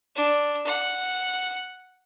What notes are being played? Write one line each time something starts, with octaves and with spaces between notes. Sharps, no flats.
D4
F#5